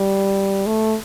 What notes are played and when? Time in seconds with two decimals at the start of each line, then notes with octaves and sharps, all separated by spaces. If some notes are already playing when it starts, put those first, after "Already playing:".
Already playing: G3
0.66 A3